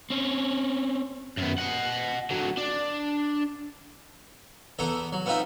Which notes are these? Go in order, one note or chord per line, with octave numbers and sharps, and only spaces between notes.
C4 C#4
F#2 B3
D#5 F#5
D3 F#3
D4
E2 B3 A4 A#5
F#3
B3 C4 D#4 F4 E5